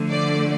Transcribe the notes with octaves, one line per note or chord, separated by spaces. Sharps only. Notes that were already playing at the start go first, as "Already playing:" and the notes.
Already playing: D3 F3 A3
D5